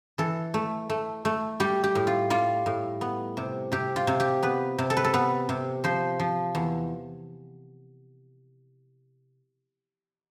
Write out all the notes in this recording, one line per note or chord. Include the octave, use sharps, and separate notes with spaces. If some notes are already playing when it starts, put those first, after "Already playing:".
E3 A4
A3
A3
A3
G3 G4
G4
A2
F4
G3 F4
A2
B3
C3
C3 G4
F4
C3
G4
B3 B4
C3
A4
B4
A4
B3 B4
C3
F3 C5
F3
E2